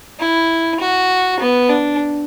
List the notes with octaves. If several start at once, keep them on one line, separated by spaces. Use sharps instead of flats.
E4
F#4
B3
D4